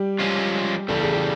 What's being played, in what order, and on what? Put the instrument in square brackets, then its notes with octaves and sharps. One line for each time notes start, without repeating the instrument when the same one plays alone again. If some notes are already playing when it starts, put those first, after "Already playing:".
Already playing: [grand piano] G3 G4
[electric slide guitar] F3 G#3 C#4 F4
[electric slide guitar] E2 C#3 G3 [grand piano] A4
[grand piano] G#4
G4